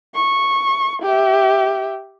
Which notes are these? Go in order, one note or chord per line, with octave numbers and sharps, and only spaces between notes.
C#6
G4 E5